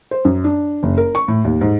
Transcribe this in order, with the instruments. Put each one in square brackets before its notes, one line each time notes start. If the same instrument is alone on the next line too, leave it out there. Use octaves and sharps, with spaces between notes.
[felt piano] C5
F#2
D4
F#1
A#4
C#6
A2
D#2
G#2